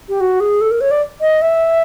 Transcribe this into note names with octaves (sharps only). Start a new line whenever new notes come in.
G4
F#4
G#4
A4
A#4
C#5
D5
D#5
E5